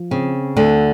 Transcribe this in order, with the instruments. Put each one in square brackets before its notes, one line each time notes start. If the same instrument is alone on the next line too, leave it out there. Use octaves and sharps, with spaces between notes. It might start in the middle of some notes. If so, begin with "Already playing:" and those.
Already playing: [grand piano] F3
[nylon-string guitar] C#3 [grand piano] C4
[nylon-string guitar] D2 D3 [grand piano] A3